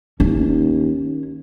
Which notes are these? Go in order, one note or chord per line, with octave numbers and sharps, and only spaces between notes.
D#2 C#4